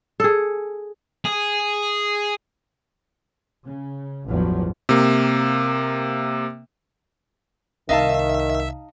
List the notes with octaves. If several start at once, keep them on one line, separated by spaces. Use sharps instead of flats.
G#4 A4
G#4
C#3
A1 E2 G2 F3 F#3
C3 A#3
C2 D#3 D#4 E5 F5 A5